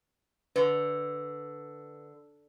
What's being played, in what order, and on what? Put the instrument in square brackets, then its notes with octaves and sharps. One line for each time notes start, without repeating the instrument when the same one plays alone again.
[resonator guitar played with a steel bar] D3 [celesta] B4